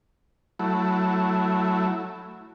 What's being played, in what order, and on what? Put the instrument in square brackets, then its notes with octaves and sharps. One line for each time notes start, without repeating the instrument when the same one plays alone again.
[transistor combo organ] F#3 A3 E4